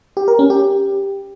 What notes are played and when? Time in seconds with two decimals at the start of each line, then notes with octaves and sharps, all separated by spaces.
0.17 G4
0.28 A#4
0.39 C#4
0.50 G4